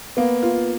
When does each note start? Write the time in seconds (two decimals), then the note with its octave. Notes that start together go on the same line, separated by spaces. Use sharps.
0.17 A#3 B3
0.42 F4